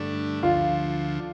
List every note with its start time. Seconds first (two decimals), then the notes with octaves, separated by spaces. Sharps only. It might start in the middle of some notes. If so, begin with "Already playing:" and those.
Already playing: G2 D3 A3 D4
0.42 D2 D3 F3 F4